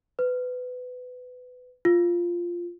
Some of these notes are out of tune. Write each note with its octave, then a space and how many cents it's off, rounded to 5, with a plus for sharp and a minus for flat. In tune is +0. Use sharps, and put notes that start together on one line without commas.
B4 +20
F4 -5